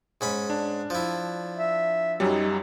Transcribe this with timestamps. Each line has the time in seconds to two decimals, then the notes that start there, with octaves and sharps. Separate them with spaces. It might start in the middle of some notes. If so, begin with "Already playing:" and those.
0.21 G#2 C#4 B5
0.50 D4
0.90 F3 E4
1.57 E5
2.20 F#2 F#3 G3 D#4